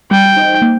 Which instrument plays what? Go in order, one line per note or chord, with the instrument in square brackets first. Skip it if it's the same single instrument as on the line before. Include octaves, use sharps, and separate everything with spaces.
[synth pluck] G3 [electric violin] G5
[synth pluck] D#4 C5 D#5
A#3